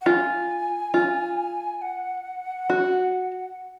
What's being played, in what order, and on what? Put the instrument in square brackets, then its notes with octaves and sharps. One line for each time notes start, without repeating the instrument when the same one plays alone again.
[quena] F#5
[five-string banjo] F4 [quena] G#5
[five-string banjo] F4
[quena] F#5
[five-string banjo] F#4